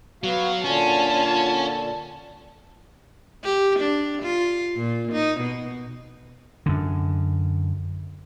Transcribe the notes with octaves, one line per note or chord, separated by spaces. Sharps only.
F#3 B3 F#4 F5
A#2 D3 C#4 F4 A5
G4
D4
F4
A#2
D#4
B2
F#2 D3